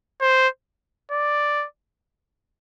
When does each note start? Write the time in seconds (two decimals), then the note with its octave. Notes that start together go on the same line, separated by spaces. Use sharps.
0.21 C5
1.11 D5